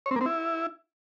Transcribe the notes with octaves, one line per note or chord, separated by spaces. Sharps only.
C#5
C4
A#3
C4
E4